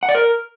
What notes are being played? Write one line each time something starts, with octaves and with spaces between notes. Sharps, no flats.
F#5
D5
A#4